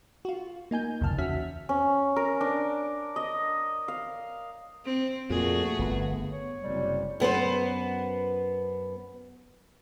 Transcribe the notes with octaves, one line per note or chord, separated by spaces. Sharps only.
F4 F#4
A#3 D#4 G#5 G6
G1 C2 F2 C#3 A5 F6
E2 C#4 F#4 E5 F6 B6
C#4
A#4
D4
D#5
F5
C4
F2 A#2 A3 F#4 G#4
G1 B3
C#5
F#1 C3 G3
F#2 B3 B4 C5